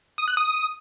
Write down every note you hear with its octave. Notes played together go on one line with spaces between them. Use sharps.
D#6
F#6
D#6